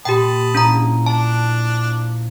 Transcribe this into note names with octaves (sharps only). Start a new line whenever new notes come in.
A#2 G4 G5 A5 B5 D#6
A#1 C#4 E4 A#5
D4 A5